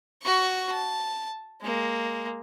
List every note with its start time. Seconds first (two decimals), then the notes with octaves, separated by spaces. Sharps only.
0.22 F#4 C#6
0.72 A5
1.62 G#3 A#3